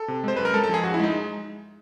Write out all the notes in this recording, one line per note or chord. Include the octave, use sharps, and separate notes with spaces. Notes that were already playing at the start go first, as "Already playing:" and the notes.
Already playing: A4
C3
G#3 C5
F#2 B4
A#4
G#3 A4
A4
F3 G#4
F#2 F#4
E4
G#3 D#4